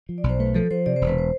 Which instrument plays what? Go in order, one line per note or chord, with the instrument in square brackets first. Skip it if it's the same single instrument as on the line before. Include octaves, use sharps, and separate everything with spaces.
[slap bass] F3
[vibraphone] D5
[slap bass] B1
[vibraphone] C5
[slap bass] A3 [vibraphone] B4
[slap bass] F3 [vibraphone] A4
[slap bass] F3 [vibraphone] C5
[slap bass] C3 [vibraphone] D5
[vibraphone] C5
[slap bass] E1
[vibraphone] B4
C5